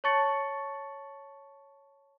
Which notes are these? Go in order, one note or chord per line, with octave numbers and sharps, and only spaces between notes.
C#5 A5 C#6 A6 C#7 F#7